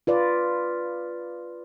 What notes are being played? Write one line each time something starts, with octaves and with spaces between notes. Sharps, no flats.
F4 B4 D5